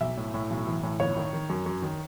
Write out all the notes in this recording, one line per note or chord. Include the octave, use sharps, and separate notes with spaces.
B1 E5
A2
A2
B1
E3
A2
G1 C#5
D#3
D#3
F#2
F#2
D#3